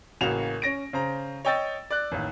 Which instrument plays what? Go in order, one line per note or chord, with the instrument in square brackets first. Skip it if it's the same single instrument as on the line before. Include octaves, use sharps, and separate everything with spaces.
[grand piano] A1 C#3 A#3 F#4 E7 F7
C#4 A#6 D7
C#3 C5 A#5
C#5 D#5 G5 E6 A6
D5 F#6
A1 D#2